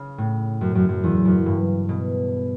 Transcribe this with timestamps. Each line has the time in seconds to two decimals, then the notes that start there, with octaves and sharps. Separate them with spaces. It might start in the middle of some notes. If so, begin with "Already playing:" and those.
Already playing: C#3
0.18 A2
0.61 F#2
0.75 F#2
0.89 F#2
1.03 E2
1.25 F#2
1.46 G2
1.89 B2